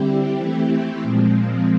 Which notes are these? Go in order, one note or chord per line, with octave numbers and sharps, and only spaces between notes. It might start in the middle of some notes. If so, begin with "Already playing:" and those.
Already playing: D3 G3 C4 E4 G4
E3 A3 C4 E4 G4
A#2 F3 G#3 C4